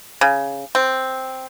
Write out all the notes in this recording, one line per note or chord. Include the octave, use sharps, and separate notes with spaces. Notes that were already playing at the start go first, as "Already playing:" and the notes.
C#3
C4